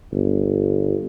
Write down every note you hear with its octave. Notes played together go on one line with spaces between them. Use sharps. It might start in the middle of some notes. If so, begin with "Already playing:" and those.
G1